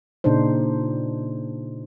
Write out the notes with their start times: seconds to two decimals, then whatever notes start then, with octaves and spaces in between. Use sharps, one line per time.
0.24 A#2 C#3 D4 D#4 C5